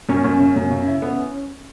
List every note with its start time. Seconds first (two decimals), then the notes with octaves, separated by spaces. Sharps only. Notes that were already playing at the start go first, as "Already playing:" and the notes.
0.09 F#2 C#4
0.24 F#2 C#4
0.40 C#3
0.56 F#2
0.71 C#3
0.87 E4
1.02 B3